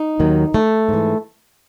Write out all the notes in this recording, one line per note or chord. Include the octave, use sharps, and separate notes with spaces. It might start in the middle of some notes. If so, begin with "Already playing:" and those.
Already playing: D#4
D#2 D#3 F#3
A3
G#2 E3